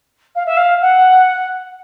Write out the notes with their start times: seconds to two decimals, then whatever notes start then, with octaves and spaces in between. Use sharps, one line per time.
0.35 F5
0.45 E5
0.56 F5
0.81 F#5